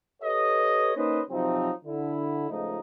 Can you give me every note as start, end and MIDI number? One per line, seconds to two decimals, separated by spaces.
0.23 0.93 67
0.23 0.93 69
0.23 0.93 71
0.23 0.93 73
0.23 0.93 75
0.96 1.21 58
0.96 1.21 61
0.96 1.21 63
0.96 1.21 71
0.96 1.21 72
0.96 1.21 75
1.31 1.72 48
1.31 1.72 53
1.31 1.72 54
1.31 1.72 60
1.31 1.72 63
1.85 2.50 50
1.85 2.50 64
2.50 2.79 37
2.50 2.79 53
2.50 2.79 57
2.50 2.79 63